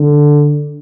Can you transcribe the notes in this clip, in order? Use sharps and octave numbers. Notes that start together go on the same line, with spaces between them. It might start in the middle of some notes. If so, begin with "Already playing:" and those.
Already playing: D3